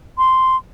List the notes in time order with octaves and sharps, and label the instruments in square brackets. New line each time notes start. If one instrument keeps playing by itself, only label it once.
[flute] C6